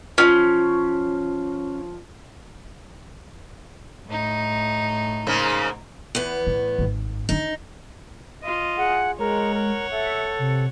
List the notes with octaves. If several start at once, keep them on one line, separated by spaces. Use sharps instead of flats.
F3 C#4
A2 D#4
G#2 C#3 A#3
E2 B3
A2
G#1 G#2
E3 D4 D#4
F4 D#5
G#4 F#5
G#3 A#4 C#5 F#5
A#4
A4 E5
C3